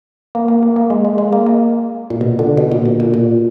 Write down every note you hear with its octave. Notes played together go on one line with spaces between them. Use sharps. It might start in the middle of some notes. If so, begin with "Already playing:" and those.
A#3
A#3
A#3
A#3
G#3
G#3
G#3
A#3
A#3
A#2
B2
D3
B2
A#2
B2
A#2
A#2